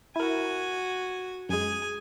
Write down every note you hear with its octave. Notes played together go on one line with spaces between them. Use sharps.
E4 F#4 A#4 G#5
F#2 G#3 G#4 G#5